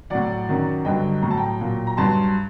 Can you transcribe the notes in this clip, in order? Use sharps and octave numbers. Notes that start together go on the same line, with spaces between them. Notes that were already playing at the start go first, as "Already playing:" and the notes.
A2 F#3 D5 F#5
F#2 D#3 F#3
G2 D3 F#3 D#5 G5
A2 F#3 A#5
A5
G5 A#5
A#2 F#3
A#5
G2 F#3 A5 C6